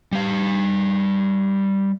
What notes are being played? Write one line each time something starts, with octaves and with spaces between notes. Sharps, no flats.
G3 F5